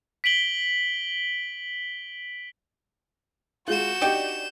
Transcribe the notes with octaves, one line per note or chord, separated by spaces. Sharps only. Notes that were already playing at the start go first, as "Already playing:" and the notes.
B6 D7 F#7 G7
G#3 F4 F#4 G6 E7
D4 D#4 G4 D5 G5